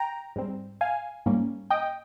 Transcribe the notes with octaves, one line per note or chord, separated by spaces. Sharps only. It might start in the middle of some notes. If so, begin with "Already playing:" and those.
Already playing: G5 A#5
G#2 G3 C4
F5 G#5
G#2 G3 A#3 C#4
D#5 G5